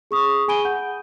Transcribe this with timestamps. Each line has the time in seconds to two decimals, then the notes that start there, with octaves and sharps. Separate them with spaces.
0.11 G#4 C#6 D#6
0.48 G#4 G#5 B5 D7 D#7 G7
0.65 F#5 G6